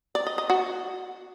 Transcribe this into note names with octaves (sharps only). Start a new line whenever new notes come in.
D5
D#5
D#5
F#4